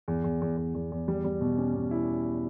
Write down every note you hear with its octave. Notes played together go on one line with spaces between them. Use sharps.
E2
E2
E2
E2
E2
E2
G3
G3
B2
C#4
B2
E4